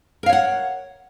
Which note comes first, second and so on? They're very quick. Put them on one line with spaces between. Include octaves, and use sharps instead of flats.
A#4 F5 C#5 F#5